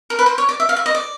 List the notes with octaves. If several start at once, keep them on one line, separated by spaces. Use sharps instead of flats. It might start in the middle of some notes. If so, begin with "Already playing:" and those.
A#4
B4
C5
C#5
D5
E5
F5
E5
D#5
D5